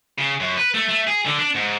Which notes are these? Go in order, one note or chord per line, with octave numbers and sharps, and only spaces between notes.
C#3
F#2
B4
A3
A3
G#4
D3
D4
G#2